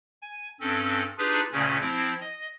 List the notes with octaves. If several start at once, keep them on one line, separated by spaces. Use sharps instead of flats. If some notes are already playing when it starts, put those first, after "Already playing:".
G#5
G2 C4 C#4 A4
D4 D#4 F4 G4 G#4 B4
D2 A#2 C#3 C#4
F3 C4 E4
D#5